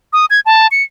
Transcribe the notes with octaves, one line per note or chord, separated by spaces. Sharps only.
D#6
G#6
A5
C#7